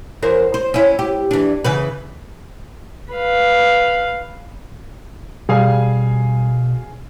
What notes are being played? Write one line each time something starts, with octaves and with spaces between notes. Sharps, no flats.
E2 A#4 C5
C5
C#4 E4
G4
E3 D4
C#3 E3 B4
B4 F5
B2 G3 G#4 F5 G#5